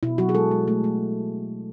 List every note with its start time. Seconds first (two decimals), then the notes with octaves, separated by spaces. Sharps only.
0.03 B2 E4
0.18 F#3 F#4
0.29 G#4
0.35 G#3 A4
0.51 G#3
0.68 A3
0.84 A3